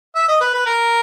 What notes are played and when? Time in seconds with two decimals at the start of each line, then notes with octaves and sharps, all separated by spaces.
0.15 E5
0.28 D#5
0.41 B4
0.53 B4
0.66 A#4